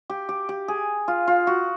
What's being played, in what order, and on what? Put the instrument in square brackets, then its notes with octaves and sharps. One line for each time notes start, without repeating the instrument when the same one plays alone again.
[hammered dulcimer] G4
G4
G4
G#4
F4
F4
F#4